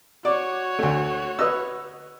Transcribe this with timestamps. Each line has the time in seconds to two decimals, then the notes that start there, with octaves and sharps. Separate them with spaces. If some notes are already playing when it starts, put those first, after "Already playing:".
0.25 F#4 C#5 D5
0.79 D2 A3
1.39 B4 D#5 E6